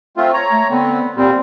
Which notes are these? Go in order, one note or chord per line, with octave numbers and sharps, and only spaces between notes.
A3 C4 F4
C#5 A#5
A3
D3 B3 C4
A#2 G3 C4